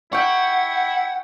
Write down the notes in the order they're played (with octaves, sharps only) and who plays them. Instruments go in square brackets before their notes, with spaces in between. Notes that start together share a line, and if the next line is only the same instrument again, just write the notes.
[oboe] E4 [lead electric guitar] F#5 [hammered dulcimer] G5 C#6